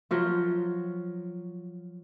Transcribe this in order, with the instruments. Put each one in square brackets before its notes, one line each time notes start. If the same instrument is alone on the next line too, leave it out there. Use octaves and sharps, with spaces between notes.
[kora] F3 F#3 F4